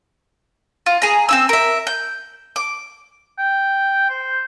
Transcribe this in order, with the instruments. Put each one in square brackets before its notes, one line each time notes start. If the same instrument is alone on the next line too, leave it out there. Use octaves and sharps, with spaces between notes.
[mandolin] F4
G#4 A#5
C4 E4 E6
A#4 E5
G6
D6
[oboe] G5
C5